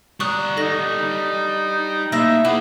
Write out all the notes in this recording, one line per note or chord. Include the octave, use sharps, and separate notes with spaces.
G3 D4 A#5 C#6 D#6 F#6
D#4 A4 F#6 A#6
A2 A#3 E5 A#6
B3 E4 G#4 D6